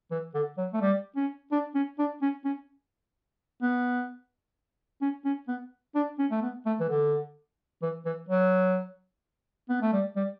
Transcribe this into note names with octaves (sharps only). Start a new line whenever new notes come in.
E3
D3
F#3
A3
G3
C#4
D4
C#4
D4
C#4
C#4
B3
C#4
C#4
B3
D4
C#4
A3
B3
A3
E3
D3
E3
E3
F#3
B3
A3
G3
G3